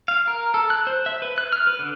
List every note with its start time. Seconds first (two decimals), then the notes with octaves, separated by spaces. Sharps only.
0.08 F5
0.27 A#4
0.54 A4
0.70 F#6
0.87 C5
1.06 E5
1.22 B4
1.38 F#6
1.52 F6
1.67 B4
1.79 D3